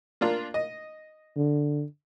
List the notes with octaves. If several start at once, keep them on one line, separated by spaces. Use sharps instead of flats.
A#3 D4 F4
D#5
D3